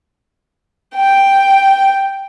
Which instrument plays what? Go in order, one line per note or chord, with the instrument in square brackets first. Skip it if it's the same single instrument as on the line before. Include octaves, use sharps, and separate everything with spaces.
[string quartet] G5